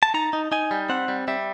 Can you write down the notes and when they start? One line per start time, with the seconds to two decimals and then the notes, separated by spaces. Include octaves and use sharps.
0.03 A5
0.14 D#4 A#5
0.33 D#4
0.52 D#4 G#5
0.71 G3
0.89 C4 F#5
1.08 G3
1.28 G3 E5